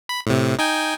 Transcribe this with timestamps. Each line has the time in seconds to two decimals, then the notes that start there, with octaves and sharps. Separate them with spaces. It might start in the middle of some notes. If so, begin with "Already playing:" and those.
0.09 B5
0.27 A2 C3
0.59 D#4 G5 G#5